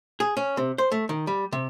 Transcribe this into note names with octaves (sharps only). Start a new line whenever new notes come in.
G#4
C#4
C3
C5
A3
D#3
G3
C3